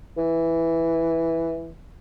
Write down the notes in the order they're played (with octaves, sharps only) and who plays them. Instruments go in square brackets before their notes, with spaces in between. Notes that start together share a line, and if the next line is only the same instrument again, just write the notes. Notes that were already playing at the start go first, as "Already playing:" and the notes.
[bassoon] E3